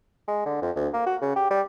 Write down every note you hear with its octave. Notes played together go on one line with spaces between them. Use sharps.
G#3
D3
F2
D2
A#3
F#4
C#3
G4
G3